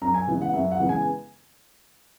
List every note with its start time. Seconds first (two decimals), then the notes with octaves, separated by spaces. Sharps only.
0.02 F#2 A#5
0.14 G#5
0.27 C#3 E3 G#3 B3
0.42 F#5
0.53 F#2 E5
0.71 F#5
0.80 C#3 E3 G#3 B3
0.89 G#5